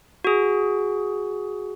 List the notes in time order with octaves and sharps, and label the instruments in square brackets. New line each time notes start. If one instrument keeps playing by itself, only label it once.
[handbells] F#4 G#4